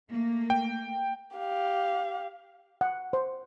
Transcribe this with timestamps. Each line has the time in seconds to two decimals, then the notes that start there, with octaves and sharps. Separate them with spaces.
0.11 A3 A#3
0.50 G5
1.36 G4 F5
2.81 F#5
3.13 C5